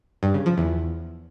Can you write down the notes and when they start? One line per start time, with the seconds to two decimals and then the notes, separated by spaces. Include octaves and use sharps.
0.23 G2
0.34 C#3
0.46 F3
0.58 E2